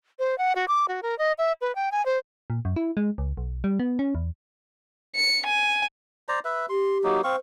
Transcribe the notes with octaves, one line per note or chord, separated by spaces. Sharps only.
C5
F#5
F#4
D6
F#4
A#4
D#5
E5
B4
G5
G#5
C5
A#2
F#2
E4
G#3
C#2
B1
G3
B3
C#4
E2
C#7
G#5
C5 D5 A#5
B4 E5
G4 C6
F#3 A#3 D#4
C4 C5 F5 C#6